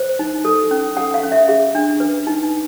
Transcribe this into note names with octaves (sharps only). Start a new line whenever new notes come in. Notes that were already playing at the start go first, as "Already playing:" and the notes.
Already playing: C5
D#4
A4
C#4
A4 F#5
F5
C#4
E5
G#4
D4
B4
D#4